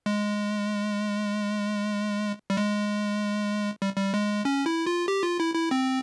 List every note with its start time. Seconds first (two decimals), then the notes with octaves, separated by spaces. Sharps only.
0.06 G#3
2.50 G3
2.57 G#3
3.82 G3
3.97 G3
4.14 G#3
4.45 C#4
4.66 E4
4.86 F4
5.08 G4
5.23 F4
5.40 E4
5.55 E4
5.71 C4